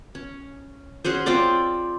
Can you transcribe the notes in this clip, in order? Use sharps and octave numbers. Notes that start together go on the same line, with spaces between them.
C#4
C#4 F#4 G#4 C5
C4 F4 C5 D5